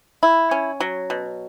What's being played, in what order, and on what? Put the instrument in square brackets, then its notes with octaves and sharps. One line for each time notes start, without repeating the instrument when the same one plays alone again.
[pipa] E4
C#4
F#3
B2